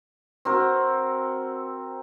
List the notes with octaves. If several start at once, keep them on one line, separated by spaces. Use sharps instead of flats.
C4 F#4 A#4